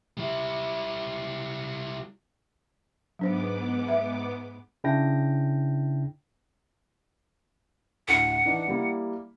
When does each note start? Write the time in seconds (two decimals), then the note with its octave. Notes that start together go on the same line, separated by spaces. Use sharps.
0.17 G3 E4
3.19 G#2 F#3 B3 D4 C5 D6
3.89 E5
4.84 C#3 D4 E4 G5 A#6
8.08 D2 A2 F#5
8.45 D#3 E3 D4
8.68 G3 A#3 E4